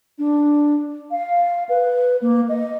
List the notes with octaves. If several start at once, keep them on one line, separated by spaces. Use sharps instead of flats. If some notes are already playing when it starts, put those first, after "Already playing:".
D4
F5
B4
A#3
D#5